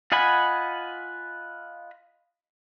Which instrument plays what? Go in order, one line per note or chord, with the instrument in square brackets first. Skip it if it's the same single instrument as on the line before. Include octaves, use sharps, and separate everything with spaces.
[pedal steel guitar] F4 D#5 F#5 G#5 B5